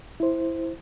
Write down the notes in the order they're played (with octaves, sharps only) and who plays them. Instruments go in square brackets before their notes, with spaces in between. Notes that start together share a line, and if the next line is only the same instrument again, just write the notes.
[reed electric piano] E4 C5